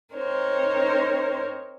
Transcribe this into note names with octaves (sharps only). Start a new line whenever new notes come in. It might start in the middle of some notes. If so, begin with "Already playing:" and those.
C4 D#4 A#4 C5 C#5